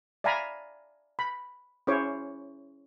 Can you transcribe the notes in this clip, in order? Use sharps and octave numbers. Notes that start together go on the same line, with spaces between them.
D5 E5 F5 G#5 A#5 B5
B5
C#4 E4 G#4 C5 C#5 D6